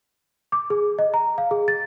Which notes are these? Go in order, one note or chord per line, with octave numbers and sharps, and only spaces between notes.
D6
G#4
D#5
A#5
F5
G#4
A6